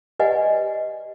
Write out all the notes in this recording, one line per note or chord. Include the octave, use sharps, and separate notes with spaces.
G4 B4 D5 D#5 F#5 G#5